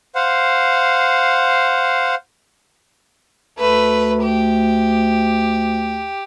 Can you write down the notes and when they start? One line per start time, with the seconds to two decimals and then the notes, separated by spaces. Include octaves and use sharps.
0.15 C5 F5 F#5
3.58 D2 A3 B4
4.23 G4